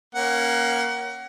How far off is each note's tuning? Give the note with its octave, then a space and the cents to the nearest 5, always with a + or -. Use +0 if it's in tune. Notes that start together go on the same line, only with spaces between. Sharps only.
A#3 +20 C#4 +0 F#5 +30